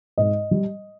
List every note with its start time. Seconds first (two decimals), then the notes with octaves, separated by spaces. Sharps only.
0.18 G#2 D#5
0.51 G3